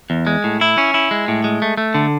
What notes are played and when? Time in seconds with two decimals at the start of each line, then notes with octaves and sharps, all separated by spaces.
0.10 E2
0.27 G#3
0.44 A2
0.61 E4
0.78 C#4
0.94 E4
1.11 G#3
1.28 A2
1.44 G#3
1.62 A3
1.77 A3
1.95 D3